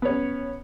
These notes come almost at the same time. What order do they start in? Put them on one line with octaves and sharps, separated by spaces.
B3 C#5 C#4